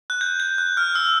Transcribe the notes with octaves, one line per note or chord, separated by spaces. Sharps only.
F#6
G6
G6
F#6
F6
E6